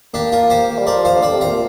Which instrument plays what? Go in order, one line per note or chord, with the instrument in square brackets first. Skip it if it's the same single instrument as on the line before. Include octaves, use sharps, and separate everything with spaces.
[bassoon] A#3 [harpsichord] D4 G4
[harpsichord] F4 A#4
G4 C5
[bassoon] A#3
G3
[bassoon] F3 [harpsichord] A#4 D5
[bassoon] F3 [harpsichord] C5 F5
[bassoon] D3
[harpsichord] D5 G5
[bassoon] C3
[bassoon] A#2 [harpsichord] F5 A#5